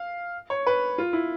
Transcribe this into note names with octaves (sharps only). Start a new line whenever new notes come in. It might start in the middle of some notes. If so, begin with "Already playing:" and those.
Already playing: F5
C#5
B4
F4
E4